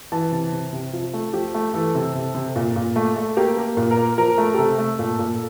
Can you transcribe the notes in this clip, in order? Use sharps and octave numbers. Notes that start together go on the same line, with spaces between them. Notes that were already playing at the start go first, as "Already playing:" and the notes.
E3 A5
C3
C3
C3
F3
A3
F3 G4
A3
E3 A4
C3
C3
C3
A#2
A#2
A3
A3
A#3 G4
A#3
A#2
A#4
A#3
F3 A#4
A3
G4
C3 A4
A3
A#2
A#2